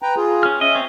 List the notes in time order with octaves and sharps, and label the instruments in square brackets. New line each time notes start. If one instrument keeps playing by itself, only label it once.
[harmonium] B4 G5 A#5
F4 G#4
[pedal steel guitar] C#4 F6
[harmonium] C#4 E5 [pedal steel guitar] D#5
[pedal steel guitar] C4 C#5